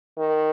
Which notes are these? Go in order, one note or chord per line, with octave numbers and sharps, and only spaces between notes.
D#3